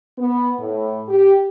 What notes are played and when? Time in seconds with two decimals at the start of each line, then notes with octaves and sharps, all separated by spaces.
0.18 B3
0.60 A2
1.09 G4